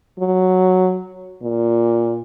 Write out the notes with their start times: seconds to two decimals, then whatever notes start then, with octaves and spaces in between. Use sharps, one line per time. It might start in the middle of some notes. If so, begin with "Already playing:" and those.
0.19 F#3
1.42 A#2